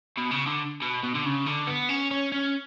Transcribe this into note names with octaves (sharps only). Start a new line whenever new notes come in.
B2
C#3
D3
B2
B2
D3
C#3
D3
B3
C#4
C#4
C#4